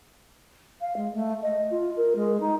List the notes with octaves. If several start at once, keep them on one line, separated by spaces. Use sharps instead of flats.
F5
G#3
A3
D#5
F4
A#4
G#3
D#4